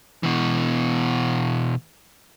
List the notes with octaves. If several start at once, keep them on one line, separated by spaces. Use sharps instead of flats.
B2 E3